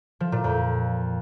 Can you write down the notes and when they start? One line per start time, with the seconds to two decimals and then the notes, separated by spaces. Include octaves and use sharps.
0.20 F3
0.32 A#2
0.44 F2